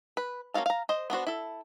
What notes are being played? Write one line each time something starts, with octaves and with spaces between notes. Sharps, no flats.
B4
A#3 C#4 F#4 F5 A5
F5 A#5
C5 D#5
B3 D4 F#4 C5
E4 A4